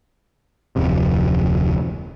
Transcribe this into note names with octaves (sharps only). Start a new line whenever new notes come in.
D1 F2 C3